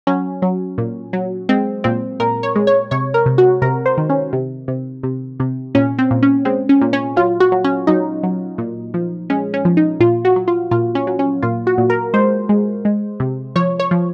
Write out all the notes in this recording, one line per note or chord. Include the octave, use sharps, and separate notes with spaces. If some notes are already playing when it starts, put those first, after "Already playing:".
F#3 C#4
F#3
A#2
F#3
G#3 C4
A#2 C4
A#2 A#4
C#5
G#3
C#5
C3 C#5
A#4
C3
F#4
C3 A#4
C5
D#3
C#4
C3
C3
C3
C3
A#2 C#4
C4
A#2
C#4
G#3 C4
C#4
A#2
C#4
F#3 F4
F#4
F#3
C#4
F#3 D#4
F#3
A#2
F3
G#3 C#4
C#4
F3
D#4
A#2 F4
F#4
F#3
F4
A#2 F4
C#4
F#3
C#4
A#2 F4
F#4
A#2
A#4
G#3 C5
G#3
G#3
C3
F3 C#5
C#5
F3